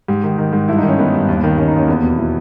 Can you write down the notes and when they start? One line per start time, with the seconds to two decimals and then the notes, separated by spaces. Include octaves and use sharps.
0.08 G#2 G4
0.24 D#3
0.38 D#3
0.53 G#2
0.68 G2 E4
0.78 D#4
0.83 D#3
0.88 C#4
0.99 D#3 B3
1.14 G2
1.28 D#2
1.43 D#3
1.58 D#3 C#4
1.68 D#4
1.74 D#2 C#4
1.88 E2 B3
2.03 B2 B3
2.18 B2 E4